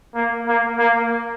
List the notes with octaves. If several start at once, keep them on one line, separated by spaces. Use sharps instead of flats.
A#3
A#3
A#3